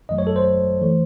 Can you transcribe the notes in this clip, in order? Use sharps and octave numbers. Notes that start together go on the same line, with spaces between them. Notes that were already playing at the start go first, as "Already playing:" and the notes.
G#1 F#2 D#3 F#3 A3 D#5
C#5
A4
C5
E3 A3